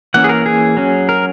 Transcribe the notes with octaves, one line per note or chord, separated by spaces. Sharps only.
E3 A#3 C#4 F#5
G#4
A#4
G#4
F#3 C#4
A#4